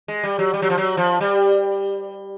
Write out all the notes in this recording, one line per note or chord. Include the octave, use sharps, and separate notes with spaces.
G#3
G3
F#3
G3
F#3
F3
F#3
F3
G3